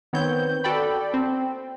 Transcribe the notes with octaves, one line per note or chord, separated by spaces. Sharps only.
D#3 B3 C4 C#5 G6
F#4 A4 D5 G5 B5
C4